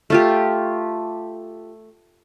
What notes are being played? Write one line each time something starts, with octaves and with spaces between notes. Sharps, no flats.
A3 F4 G4